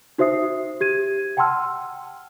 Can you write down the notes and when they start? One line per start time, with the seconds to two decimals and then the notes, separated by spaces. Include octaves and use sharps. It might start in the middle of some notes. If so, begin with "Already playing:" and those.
0.18 D#4 F#4 C5 E5 D#6 C7
0.81 G4 G#6 D#7
1.37 F#5 G5 A5 C6 E6 F6